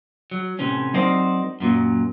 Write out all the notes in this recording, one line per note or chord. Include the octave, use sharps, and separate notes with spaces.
F#3
A2 C3 E3 C#4
F#3 C4 D#4 A#4 C5 D5
F#2 A#2 F#3